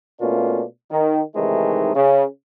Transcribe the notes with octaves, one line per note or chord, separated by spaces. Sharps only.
B2 A3 A#3 C#4 D4 F4
D#3
C3 D#3 E3 G#3 A3 D#4
C#3